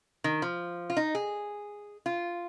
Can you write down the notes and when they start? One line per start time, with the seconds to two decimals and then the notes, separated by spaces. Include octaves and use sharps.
0.24 D#3
0.42 F3
0.90 F4
0.97 D#4
1.15 G#4
2.06 F4